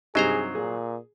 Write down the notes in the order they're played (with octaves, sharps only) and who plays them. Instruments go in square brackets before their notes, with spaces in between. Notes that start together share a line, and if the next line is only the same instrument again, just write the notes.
[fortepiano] G2 C3 D#4 [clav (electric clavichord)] F#3 C5 A#5 [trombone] G#4
[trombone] A#2 [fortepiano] G#4